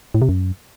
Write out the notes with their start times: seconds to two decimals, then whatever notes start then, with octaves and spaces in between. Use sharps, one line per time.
0.14 A2
0.22 C3
0.29 F#2